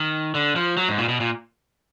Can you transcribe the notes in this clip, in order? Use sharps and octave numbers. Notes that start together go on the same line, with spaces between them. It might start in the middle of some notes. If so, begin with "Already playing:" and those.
Already playing: D#3
D3
F3
F#3
G#2
A#2
B2
A#2